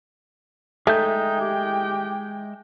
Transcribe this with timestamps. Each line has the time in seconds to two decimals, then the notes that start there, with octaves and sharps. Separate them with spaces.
0.87 G#3 A3 D#4 E5 G5 G6
1.40 G4